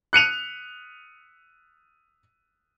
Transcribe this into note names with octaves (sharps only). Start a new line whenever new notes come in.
F#6 C#7 D#7 F7